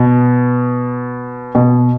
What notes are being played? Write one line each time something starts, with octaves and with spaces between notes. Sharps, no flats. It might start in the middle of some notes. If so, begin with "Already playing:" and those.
Already playing: B2
B2